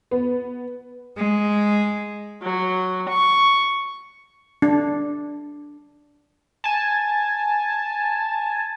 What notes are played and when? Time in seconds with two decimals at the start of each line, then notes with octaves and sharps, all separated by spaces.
0.11 B3
1.16 G#3
2.40 F#3
3.07 C#6
4.62 D4
6.64 G#5 A5